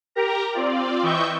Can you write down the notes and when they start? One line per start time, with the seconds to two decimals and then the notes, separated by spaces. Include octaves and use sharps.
0.15 G4 A#4 A#5
0.53 C4 F4 D5
1.03 E3 D#5 E5 G5 C#6 G6